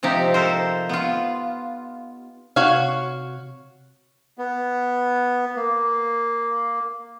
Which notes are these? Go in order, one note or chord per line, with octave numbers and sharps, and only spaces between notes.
C3 F3 D#4 G4
A4 A#4 C5
B3 F4
C3 F#4 C#5 F5
B3
A#3